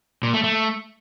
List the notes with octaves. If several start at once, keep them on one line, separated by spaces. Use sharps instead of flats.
A#2
A3
A3